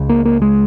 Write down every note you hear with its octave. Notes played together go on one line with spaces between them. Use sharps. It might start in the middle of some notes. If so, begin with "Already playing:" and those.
Already playing: C#2 C#3
A#3
A#3
G#3